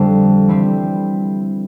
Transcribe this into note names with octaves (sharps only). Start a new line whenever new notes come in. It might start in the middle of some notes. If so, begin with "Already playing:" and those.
Already playing: F2 D3 G3 D4
E3 G3 C4